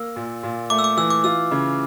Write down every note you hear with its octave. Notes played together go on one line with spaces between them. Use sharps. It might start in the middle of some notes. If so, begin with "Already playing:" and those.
Already playing: A#3 E6
A#2
A#2
A3 D6
E6
D6
E3 E6
D6
F4 E6
C#3